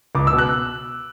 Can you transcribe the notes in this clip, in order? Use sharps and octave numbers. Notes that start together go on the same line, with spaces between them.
C#2 D6
E6
B2
F#6